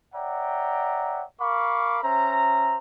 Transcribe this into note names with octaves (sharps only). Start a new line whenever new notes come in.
C#5 D5 E5 F#5 G5 A#5
A#4 F5 B5 C#6 D6
C#4 C5 E5 A#5